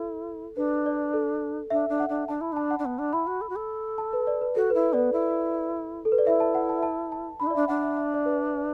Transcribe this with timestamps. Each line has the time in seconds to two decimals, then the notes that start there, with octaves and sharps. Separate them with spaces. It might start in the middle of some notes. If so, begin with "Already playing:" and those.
Already playing: E4 A4
0.57 D4 B4
0.86 D5
1.13 A4
1.70 D4 E5
1.89 D4
2.00 F#5
2.09 D4
2.28 D4 A5
2.41 E4 B5
2.53 D4 A5
2.70 F#5
2.79 D4
2.84 B3 F#5
2.99 D4
3.13 E4 B5
3.27 F#4
3.41 A4
3.49 F#4
3.56 A4
3.98 A5
4.13 B4
4.27 D5
4.41 B4
4.56 F#4 A4
4.70 E4 B4
4.84 B4
4.93 B3 D5
4.98 B4
5.13 E4 A4
6.05 A4
6.12 B4
6.18 D5
6.26 E4 E5
6.40 A5
6.55 F#5
6.69 A5
6.83 A5
7.12 A5
7.40 D4 B5
7.47 E4
7.50 D5
7.55 D4 E5
7.68 D4 F#5
7.83 E5
7.97 E5
8.14 D5
8.25 B4